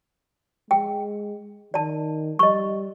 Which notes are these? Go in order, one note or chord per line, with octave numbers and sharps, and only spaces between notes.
G#3 G5
D#3 D5 A5
G3 D#5 C#6